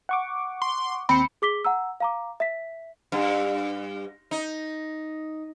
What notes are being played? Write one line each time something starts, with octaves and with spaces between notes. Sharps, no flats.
F#5 C#6 D6
C6
D#2 C4 B5 C#7
G#4 D6 B6 G7
F#5 A#5 E6
F5 A#5 D6
E5 B6
G2
D#4